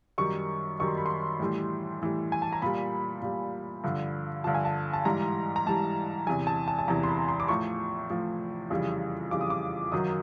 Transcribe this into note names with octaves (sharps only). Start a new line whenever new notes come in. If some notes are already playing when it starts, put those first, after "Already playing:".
F#2 D#3 G3 C#6
F#2 D#3 G3 C#6
C6
B5
C6
A2 E3 G3
A2 E3 G3
G#5
A5
A#5
A#2 G3 B5
A#2 G3
G2 D3 F3
G2 D3 F3 A5
G#5
A5
A5
G#2 E3 G3 A#5
A#5
G#2 E3 G3 A5
E2 C3 E3 G#5
A5
A5
A5
E2 C3 E3 A#5
C6
B5
C6
D6
A2 F3 C#6
A2 F3
F2 C#3 E3 G3
F2 C#3 E3 G3 D6
D#6
D6
F#2 D#3 F#3 D#6